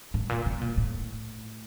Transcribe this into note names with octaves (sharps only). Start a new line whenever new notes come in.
A2
A#2
B2
A#2
A2